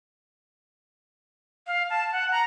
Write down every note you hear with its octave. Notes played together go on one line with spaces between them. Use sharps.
F5
A5
F#5
A#5